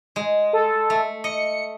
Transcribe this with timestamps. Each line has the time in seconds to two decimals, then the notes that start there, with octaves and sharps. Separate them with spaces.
0.16 G#3
0.53 A4
0.90 A3
1.24 D#5 C#7